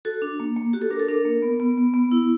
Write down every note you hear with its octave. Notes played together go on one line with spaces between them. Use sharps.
F#4 A4
D4
A#3
A#3
F#4 G4
A4
D4 A#4
A4
D4 A#4
A#3
B3
B3
B3
B3
E4